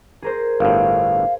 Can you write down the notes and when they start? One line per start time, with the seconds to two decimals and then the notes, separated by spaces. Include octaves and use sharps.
0.22 G#4 A#4 C5
0.60 G1 A2 F5